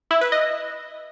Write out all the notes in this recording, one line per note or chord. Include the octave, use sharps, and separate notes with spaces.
E4
B4
D#5